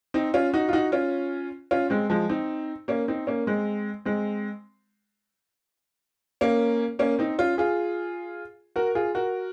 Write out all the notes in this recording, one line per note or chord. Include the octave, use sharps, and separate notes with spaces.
C4 D#4
C#4 F4
D#4 F#4
F4
D#4 F#4
C#4 F4
C#4 F4
G#3 C4
F3 G#3
C4 D#4
A#3 C#4
C4 D#4
A#3 C#4
G#3 C4
G#3 C4
A#3 C#4
A#3 C#4
C4 D#4
C#4 F4
F4 G#4
F#4 A#4
F4 G#4
F#4 A#4